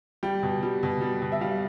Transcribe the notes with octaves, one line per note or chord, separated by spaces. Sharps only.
G3 G5
B2
G3
B2
G3
B2
E5
G3 F5